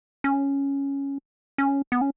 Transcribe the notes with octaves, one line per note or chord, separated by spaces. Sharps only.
C#4
C#4
B3
C#4